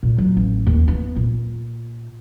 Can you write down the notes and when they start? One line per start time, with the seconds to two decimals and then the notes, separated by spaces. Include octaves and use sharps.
0.03 A#2
0.18 F#3
0.37 A1
0.66 D#2
0.88 B3
1.16 A#2